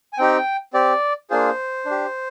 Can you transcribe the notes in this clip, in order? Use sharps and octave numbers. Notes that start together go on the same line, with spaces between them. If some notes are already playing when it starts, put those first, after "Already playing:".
G#5
C4 D#4 G4 G5
C4 G4 D5
A#3 D4 F4 G#4 C5
D4
G4